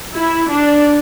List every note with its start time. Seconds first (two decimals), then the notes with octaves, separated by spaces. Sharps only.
0.13 E4
0.50 D4